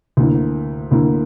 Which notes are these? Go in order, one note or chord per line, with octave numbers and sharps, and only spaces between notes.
D2 D3 A#3 E4
D2 D3 A#3 E4